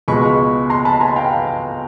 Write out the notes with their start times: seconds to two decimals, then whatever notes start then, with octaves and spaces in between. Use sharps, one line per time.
0.08 C#2 B2 G#3 B5 C#6
0.70 A#5 C6
0.85 A5 B5
1.01 G#5 A#5
1.16 F5 G5